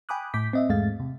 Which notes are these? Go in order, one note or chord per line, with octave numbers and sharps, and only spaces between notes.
G5 G#5 B5 D6 D#6 F#6
A2 D6 G6 B6
C4 D#5 E5
E2 G#2 G#3 A3 F5 A6
C3